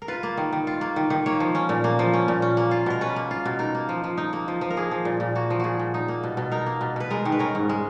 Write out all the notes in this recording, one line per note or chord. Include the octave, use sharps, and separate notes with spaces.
A#4
F4 B4
A#3
D#3
D#3
F4
A#3
D#3
D#3
A#3 C#5
F3
C#4
A#2
A#3
F3
C#4
A#2
C#4
A#3
F4
B2 A#4
C#4 B4
A#3
F4
B2
D#4 A#4
A#3
F3
F3
D#4
A#3
F3
F3
A#4
A#3 G#4
F3
A#2
A#2
A#3 F#4
F3
A#2 F#4 G#4
A#2
D#4
A#3
B2
B2
D#4 A#4
A#3
B2
B2 B4
G#3 A#4
D#3
B4
C#4 A#4
G#2
G#3